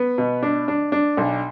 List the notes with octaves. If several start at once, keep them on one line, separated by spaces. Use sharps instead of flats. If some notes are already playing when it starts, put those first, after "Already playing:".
Already playing: B3
B2
D4
D4
D4
B1